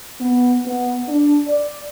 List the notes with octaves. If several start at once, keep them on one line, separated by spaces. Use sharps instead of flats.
B3
B3
D4
D5